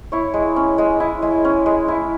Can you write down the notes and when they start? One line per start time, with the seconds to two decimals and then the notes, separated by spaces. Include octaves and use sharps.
0.12 E4 C#5
0.34 G#3
0.56 C#4
0.78 G#3
1.00 E4
1.22 G#3
1.45 C#4
1.66 G#3
1.88 E4